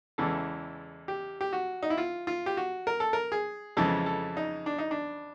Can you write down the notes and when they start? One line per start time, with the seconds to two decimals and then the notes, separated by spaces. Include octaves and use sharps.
0.18 E2 C#3 E3 G#3 A4
1.08 G4
1.41 G4
1.53 F#4
1.83 D#4
1.90 E4
1.98 F4
2.27 F4
2.46 G4
2.57 F#4
2.87 A#4
3.00 A4
3.13 A#4
3.32 G#4
3.77 F2 C#3 E3 G#3 A4
4.06 A4
4.37 D#4
4.66 D4
4.79 D#4
4.91 D4